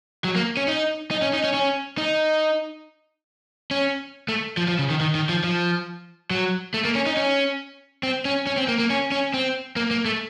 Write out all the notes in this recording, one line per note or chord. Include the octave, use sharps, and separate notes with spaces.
F#3
A#3
C#4
D#4
D#4
C#4
D#4
C#4
C#4
D#4
C#4
A3
F3
F3
C#3
D#3
D#3
D#3
F3
F3
F#3
A3
A#3
C#4
D#4
C#4
C4
C#4
C#4
C4
A#3
A#3
C#4
C#4
C4
A#3
A#3
A3